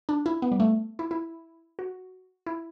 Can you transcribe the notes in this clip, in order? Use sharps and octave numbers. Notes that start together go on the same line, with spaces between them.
D4
E4
B3
G3
A3
E4
E4
F#4
E4